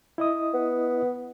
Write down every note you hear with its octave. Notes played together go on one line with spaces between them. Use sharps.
E4 D#5 D#6
B3